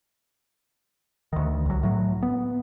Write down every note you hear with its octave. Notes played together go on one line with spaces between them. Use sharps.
D2 D#3
C2 F#3
A2 F#3
B3